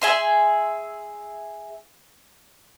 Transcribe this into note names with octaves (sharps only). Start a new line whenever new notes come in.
G#4 E5 C6